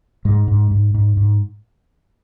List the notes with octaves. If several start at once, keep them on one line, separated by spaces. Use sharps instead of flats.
G#2 G#3
G#2
G#2
G#2
G#2